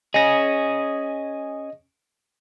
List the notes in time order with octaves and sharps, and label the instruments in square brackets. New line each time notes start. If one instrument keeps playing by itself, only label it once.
[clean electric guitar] C#4 G#4 [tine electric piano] D#5 A#6